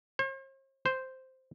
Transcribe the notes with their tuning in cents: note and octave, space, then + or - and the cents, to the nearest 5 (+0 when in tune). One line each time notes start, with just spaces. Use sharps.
C5 +45
C5 -5